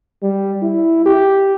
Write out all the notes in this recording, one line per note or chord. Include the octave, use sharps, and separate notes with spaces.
G3
E4
G4